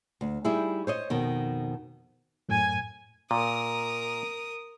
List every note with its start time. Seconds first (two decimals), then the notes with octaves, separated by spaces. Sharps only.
0.21 D2
0.44 G3 D#4 E4 G#4
0.87 C5 C#5 D#5
1.10 F2 B2 D#3
2.49 F#2 A2 G#5
3.31 A#2 A#4 D#6